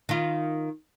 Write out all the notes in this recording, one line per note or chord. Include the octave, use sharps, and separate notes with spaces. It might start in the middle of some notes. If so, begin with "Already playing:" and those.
D#3 F4